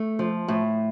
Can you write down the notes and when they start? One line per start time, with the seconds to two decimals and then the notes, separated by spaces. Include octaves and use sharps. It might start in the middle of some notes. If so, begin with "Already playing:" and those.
Already playing: A3
0.19 F3
0.48 A2